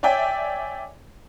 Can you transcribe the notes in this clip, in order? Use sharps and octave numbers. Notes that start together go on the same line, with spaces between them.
C#5 D5 E5 G5 G#5